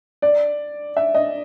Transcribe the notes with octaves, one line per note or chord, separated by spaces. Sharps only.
D5
E5
D#5